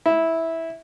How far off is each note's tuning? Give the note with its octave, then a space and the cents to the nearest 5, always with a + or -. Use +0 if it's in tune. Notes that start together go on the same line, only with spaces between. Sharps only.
E4 -10